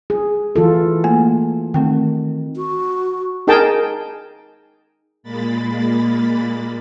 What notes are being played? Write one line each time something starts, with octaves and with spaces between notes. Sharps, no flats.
G#4
E3 F4 A4
A3 A#3 G#5
D#3 A3 C4 G5
F#4
D#4 G#4 A#4 G5 A5
A#2 G#3 A#3 B5 A6